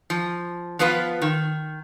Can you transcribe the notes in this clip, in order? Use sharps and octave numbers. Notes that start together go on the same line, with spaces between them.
F3
F3 B3 F4 B4
D#3